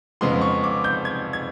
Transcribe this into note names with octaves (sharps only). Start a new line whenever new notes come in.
F2 C#3 F3 G#3 B3 C6
C#6
D6
G6
G#6
G#6